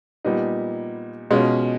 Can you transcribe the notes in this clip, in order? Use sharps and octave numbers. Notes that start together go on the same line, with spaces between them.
A#2 G3 B3 D#4
B2 G#3 C#4 F4